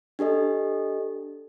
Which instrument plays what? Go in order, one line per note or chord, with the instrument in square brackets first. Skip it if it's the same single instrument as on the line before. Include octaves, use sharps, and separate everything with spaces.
[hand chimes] D4 G4 A4 D#5